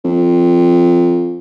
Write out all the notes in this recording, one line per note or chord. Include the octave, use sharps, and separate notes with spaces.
F2